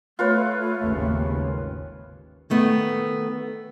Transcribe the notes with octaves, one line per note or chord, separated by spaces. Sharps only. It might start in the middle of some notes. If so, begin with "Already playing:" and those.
A3 F4 B4 C#5
G#1 D#2 C#3
D#3 A3 B3